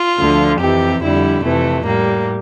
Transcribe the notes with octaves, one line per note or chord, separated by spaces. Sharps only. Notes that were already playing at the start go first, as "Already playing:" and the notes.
Already playing: F4
D2 D3 F3
F2 C3 E3 G4
F2 D3 G3 E4
F2 C3 E3 A3
A2 G3 A#3